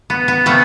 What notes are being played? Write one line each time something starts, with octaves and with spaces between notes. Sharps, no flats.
B3
B3
C3 F3 A3 B3